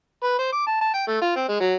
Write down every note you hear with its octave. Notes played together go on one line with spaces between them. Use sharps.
B4
C5
D6
A5
A5
G5
A3
F4
C4
G#3
F#3